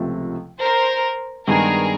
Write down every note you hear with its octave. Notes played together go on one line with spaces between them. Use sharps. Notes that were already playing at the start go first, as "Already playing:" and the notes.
Already playing: C#2 C3 F3 A3
A#4 C5
G2 D#3 G#3 B3 D4 G#4 A#4